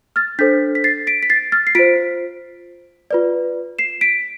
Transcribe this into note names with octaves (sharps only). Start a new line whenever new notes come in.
F6 A6
D4 A4 C5 G6 B6
B6
A6 C7
B6 D7
B6
A6 C7
F6 A6
C7
F4 C5 B6 D7
F4 B4 D5
C7 E7
B6 D7